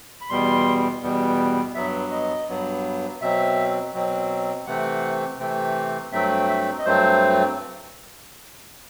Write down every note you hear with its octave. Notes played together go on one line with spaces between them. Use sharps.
B5
E2 B2 G3 B3 C6
E2 B2 G3 B3
G2 F#3 B3 E5
D#5
G2 F#3 B3
B2 F#3 C4 E5
B2 F#3 C4
C3 E3 A3 C4 F#5
C3 E3 A3 C4
G2 F#3 A3 C4 E5
E5
D#5
G2 F#3 A3 C4 C5